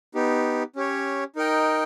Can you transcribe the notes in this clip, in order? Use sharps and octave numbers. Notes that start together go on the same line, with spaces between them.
B3 D#4 G4
C#4 G4 C#5
D#4 A#4 D#5 G5